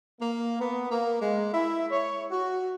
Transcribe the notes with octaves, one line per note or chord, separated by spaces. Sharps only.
A#3
B3
A#3
G#3
E4
C#5
F#4